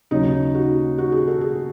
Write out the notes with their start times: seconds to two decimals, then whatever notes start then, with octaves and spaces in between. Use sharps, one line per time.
0.11 D#2 C#3 F#3 D#4
0.55 F#4
0.98 F#4
1.12 G#4
1.27 A4
1.41 G#4